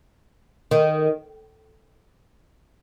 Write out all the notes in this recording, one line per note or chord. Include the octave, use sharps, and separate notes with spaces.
D#3